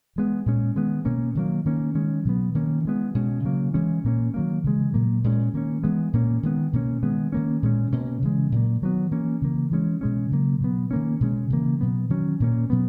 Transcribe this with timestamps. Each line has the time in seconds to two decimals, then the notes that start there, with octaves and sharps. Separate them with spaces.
0.16 E3 G#3 B3
0.46 A#2 G#3 C#4
0.76 D#3 G#3 B3
1.05 B2 A#3 C#4
1.35 D#3 F#3 A#3
1.65 D#3 A#3 C#4
1.95 D#3 G#3 C#4
2.25 B2 F#3 B3
2.55 D#3 A#3 C#4
2.85 E3 G#3 B3
3.15 B2 G#3 C#4
3.44 C#3 F#3 A#3
3.74 E3 G#3 C#4
4.04 A#2 A#3 C#4
4.34 D#3 F#3 A#3
4.64 C#3 E3 G#3
4.94 A#2 F#3 A#3
5.24 A#2 G#3 C#4
5.53 D#3 A#3 C#4
5.83 E3 G#3 B3
6.13 A#2 A#3 C#4
6.43 D#3 G#3 B3
6.73 B2 A#3 C#4
7.03 D#3 G#3 B3
7.32 D#3 A#3 C#4
7.62 A#2 G#3 C#4
7.92 B2 A#3 C#4
8.22 C#3 E3 G#3
8.52 A#2 F#3 A#3
8.82 D#3 F#3 B3
9.11 E3 A#3 C#4
9.42 C#3 E3 A#3
9.71 E3 G#3 C#4
10.01 B2 G#3 C#4
10.31 C#3 F#3 A#3
10.61 B2 F#3 B3
10.91 D#3 A#3 C#4
11.21 B2 G#3 C#4
11.50 C#3 E3 A#3
11.81 B2 F#3 B3
12.10 D#3 F#3 C#4
12.40 A#2 A#3 C#4
12.70 B2 F#3 B3